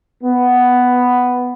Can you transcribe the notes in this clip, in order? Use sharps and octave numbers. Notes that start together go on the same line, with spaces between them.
B3